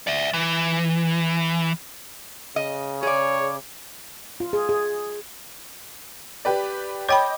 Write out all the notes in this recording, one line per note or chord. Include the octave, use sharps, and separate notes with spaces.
D5 E5
E3
C#3 D#5
G#4 C#5 D5
F4
G#4
G#4
G4 B4 D5
C#5 D#5 G5 B5 D6 G6